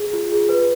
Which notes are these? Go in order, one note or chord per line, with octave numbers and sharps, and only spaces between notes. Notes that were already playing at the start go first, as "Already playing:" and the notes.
Already playing: G#4
F4
G#4
B4